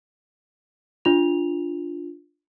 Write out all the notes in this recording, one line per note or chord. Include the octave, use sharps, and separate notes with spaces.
D4 F4 F7